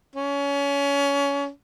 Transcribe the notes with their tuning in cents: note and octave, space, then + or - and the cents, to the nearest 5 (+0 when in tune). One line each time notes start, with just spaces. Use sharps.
C#4 +25